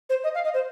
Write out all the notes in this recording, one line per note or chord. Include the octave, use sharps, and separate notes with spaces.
C5
D#5
F5
D#5
C5